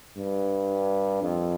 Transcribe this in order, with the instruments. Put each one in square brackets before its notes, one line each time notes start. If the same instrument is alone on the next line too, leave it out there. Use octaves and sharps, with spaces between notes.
[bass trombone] G2
F2